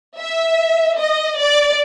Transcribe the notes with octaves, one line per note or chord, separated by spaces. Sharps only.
E5
D#5
D5